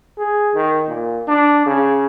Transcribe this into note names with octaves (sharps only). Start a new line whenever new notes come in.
G#4
D#3
A#2
D4
C#3